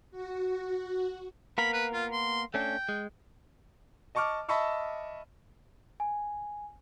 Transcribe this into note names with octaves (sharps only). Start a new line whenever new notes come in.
F#4
A#3 B3 A#4 B5
B4
F4
C6
A3 C#4 D4 G5
G#3
D#5 A5 C#6 D6 F6
D#5 E5 A5 B5 C#6 E6
G#5